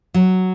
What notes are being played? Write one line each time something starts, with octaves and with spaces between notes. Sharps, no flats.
F#3